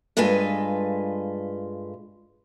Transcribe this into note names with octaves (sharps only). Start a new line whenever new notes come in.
G2 G#3 F4 A4 B4 G#5